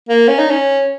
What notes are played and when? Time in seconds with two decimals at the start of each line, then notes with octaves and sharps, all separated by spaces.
0.09 A#3
0.28 C#4
0.39 D#4
0.50 C#4